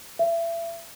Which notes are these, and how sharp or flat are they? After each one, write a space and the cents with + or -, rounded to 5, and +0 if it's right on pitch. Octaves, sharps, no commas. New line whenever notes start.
E5 +30